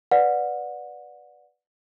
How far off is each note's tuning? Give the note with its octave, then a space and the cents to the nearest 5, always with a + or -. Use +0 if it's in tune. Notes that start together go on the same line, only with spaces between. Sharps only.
B4 +0 D5 +0 F#5 -30